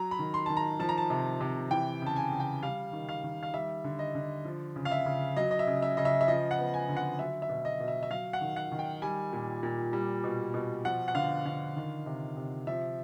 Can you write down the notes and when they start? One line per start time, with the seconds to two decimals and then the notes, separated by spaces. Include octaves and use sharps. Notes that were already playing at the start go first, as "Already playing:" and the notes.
Already playing: F#3 A#5
0.11 B5
0.19 D#3
0.34 C6
0.46 D#3 A5
0.57 A#5
0.80 F3 A5
0.89 A#5
0.98 A5
1.10 C3
1.40 C3
1.71 E3 G5
2.02 C#3 A5
2.16 G#5
2.32 C#3
2.40 G5
2.62 G3 F5
2.93 D#3
3.09 F5
3.24 D#3
3.43 F5
3.54 G3 E5
3.84 D3
3.99 D#5
4.15 D3
4.45 F3
4.76 C#3
4.85 F5
4.91 E5
5.06 C#3
5.36 F#3 D#5
5.51 D#5
5.59 E5
5.67 C#3
5.82 E5
5.97 C#3 D#5
6.05 E5
6.21 E5
6.28 F3 D#5
6.51 F#5
6.58 B3
6.74 G#5
6.89 D3
6.97 F#5
7.19 F#3 E5
7.42 E5
7.49 B2
7.65 D#5
7.80 B2
7.88 E5
8.03 E5
8.10 F#3 F5
8.33 F#5
8.41 D#3
8.56 F#5
8.72 D#3
8.79 G5
9.02 G3 G#5
9.33 A#2
9.63 A#2
9.93 G3
10.24 B2
10.54 B2
10.85 F3 F#5
11.08 F#5
11.15 D3 F5
11.45 D3 F5
11.76 D#3
12.06 C3
12.37 C3
12.67 F3 E5